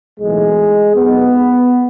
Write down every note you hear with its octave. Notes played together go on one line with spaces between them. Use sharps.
B1 A2 E3 G#3
B1 B2 B3